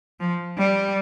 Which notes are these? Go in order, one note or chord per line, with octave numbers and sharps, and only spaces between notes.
F3
G3